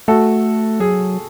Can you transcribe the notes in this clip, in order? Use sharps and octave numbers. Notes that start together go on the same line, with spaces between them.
A3 F#4 A4
F#3 G#4